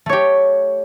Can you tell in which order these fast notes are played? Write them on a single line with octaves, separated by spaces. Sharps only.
A3 C#5 G4